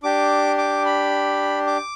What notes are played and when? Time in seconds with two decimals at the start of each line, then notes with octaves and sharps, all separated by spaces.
0.03 D4 G4 D6
0.58 D6
0.86 B5
1.67 D6